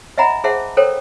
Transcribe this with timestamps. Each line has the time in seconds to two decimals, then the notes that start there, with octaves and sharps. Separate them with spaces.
0.18 D#5 E5 F#5 G#5 A#5 B5
0.44 G#4 C5 E5 F#5 A5
0.77 A4 A#4 C5 C#5 G5